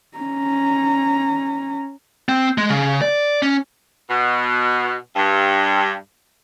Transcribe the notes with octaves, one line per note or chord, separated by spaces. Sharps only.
C#4 A#5
C4
G#3
C#3
D5
C#4
B2
G2